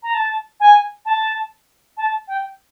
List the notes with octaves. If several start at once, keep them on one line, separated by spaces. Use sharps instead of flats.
A#5
A5
G#5
A5
A5
G5